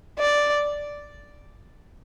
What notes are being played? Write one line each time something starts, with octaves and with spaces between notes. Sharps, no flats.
D5